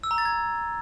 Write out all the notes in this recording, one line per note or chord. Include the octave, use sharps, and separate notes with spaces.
E6
A#5
A6
G#6